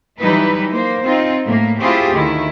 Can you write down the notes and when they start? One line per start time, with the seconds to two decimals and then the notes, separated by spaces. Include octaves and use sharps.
0.21 E3 F#3 G3 D#4 E4 B4
0.73 A#3 C5
1.04 C4 D#4 F4
1.46 A2 A#3
1.81 A3 C4 E4 F4 G4 G#4
2.13 D2 D#3 E4